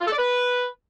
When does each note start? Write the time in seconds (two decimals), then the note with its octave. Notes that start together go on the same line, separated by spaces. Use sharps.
0.01 F4
0.06 A4
0.12 D5
0.18 B4